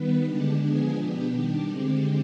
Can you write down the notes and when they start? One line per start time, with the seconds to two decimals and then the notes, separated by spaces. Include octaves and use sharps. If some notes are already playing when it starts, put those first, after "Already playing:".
Already playing: D#3 G3 B3 B4
0.29 D3 G#3 D4 G4
0.63 F3 G#3 B3 D4 G#4
0.98 B2 B3 D4 G4
1.33 D#3 G3 D4
1.69 D3 G#3 C4